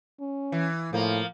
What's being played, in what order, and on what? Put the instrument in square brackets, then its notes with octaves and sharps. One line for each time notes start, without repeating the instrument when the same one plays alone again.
[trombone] C#4
[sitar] E3
[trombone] A2 [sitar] F3 A#3